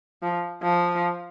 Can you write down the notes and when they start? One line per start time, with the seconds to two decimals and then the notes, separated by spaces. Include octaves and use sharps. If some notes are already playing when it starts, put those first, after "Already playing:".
0.22 F3
0.62 F3